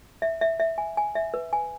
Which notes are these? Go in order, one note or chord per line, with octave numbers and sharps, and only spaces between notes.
E5
E5
E5
G#5
G#5
E5
B4
G#5